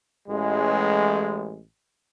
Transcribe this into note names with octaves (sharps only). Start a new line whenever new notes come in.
A1 G#3